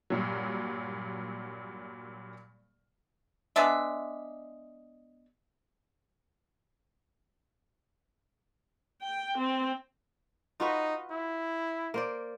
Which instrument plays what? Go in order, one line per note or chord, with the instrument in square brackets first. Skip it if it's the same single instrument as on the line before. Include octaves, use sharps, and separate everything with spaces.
[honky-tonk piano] G2 A#2 F#3
[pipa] G#3 B3 D4 E5
[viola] G5
C4
[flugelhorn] D#4 [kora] F4 F#4 B4
[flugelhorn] E4
[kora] A#3 C5 D5